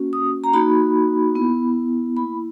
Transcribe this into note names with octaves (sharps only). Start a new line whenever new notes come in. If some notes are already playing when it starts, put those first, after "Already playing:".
Already playing: A#3 C#4 F#4
D#6
A#5
A#3 D#4 F#4 B5
B3 E4
A#3 E4 B5